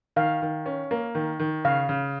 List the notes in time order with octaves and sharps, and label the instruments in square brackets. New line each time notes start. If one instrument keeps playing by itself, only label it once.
[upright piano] D#3 [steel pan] F5
[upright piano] D#3
C#4
A#3
D#3
D#3
[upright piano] C#3 [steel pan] F5
[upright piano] C#3